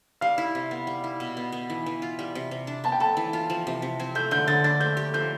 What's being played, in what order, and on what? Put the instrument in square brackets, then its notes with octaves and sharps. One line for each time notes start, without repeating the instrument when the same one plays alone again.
[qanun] G3 [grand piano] F5
[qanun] E4
C3
B3
G3
E4
B2
B3
B3
E3
E3
F4
G3
C3
C3
D4
[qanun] B3 [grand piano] A5
[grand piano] G5
[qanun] A4 [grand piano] A5
[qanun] E3
F4
F3
C3
C3
C4
[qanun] A3 [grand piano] G6
[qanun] D3 [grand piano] G6
[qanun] D3 [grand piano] A6
[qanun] D4 [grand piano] A6
[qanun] A3 [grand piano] G6
[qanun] G4
[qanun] F3 [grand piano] G6